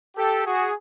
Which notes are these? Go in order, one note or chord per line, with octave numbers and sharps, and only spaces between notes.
G4 A4
F#4 G#4